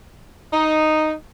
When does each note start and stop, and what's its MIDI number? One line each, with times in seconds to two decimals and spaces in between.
0.52 1.13 63